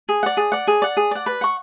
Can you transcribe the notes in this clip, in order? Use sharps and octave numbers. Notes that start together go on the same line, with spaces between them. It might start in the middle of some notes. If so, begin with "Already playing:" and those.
G#4
D5 F#5
G#4
D5 F#5
G#4
D5 F#5
G#4
D5 F#5
B4
F#5 C#6